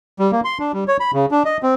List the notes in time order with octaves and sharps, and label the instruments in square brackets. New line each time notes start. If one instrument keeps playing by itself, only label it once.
[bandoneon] G3
A#3
C6
D4
G3
C#5
B5
C#3
D4
D#5
C4